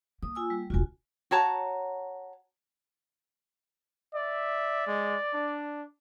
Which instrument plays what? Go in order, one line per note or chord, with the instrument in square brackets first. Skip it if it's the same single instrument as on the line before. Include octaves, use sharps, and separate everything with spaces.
[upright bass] A#3 [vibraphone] D#6
[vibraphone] F4 G#5 E6
G3
[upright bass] E1 C#2 [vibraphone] F4 F#4 G#5
[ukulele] F#4 C#5 A5 A#5
[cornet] D5 [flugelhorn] E5
[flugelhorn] G#3
D4